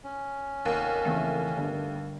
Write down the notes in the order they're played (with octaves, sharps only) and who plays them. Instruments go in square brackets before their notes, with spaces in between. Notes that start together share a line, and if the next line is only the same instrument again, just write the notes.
[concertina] C#4
[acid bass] F1 [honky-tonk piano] D#2 [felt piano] F#5
[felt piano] F2 C#3 E3 [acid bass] A3
[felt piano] G1 G2